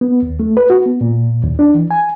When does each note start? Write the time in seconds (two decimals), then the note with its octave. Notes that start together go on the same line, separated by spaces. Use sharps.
0.01 B3
0.23 D#2
0.40 A3
0.57 B4
0.70 F#4
0.86 B3
1.01 A#2
1.43 D#2
1.59 D4
1.74 E3
1.91 G#5